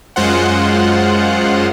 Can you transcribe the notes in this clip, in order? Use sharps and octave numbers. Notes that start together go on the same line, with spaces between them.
F#2 G#3 F4 C5 F#5